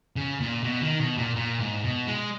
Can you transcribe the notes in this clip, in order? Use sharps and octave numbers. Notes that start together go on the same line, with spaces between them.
C#3
A#2
B2
D#3
B2
A#2
A#2
G#2
B2
G#3